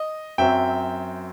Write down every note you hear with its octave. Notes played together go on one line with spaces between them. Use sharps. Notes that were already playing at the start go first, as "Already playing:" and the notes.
Already playing: D#5
F#2 F#3 C4 E5 G5